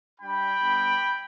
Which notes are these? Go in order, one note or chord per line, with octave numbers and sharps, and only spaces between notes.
G3 D4 G4 G5 B5
G3 B3 D4